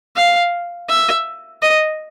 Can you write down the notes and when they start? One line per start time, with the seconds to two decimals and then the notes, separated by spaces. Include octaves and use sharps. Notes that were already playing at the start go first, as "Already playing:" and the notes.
0.16 F5
0.89 E5
1.62 D#5